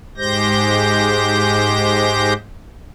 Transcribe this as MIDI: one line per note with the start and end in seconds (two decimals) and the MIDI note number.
0.18 2.33 44
0.18 2.33 56
0.18 2.33 67
0.18 2.33 72
0.18 2.33 91
0.18 2.33 94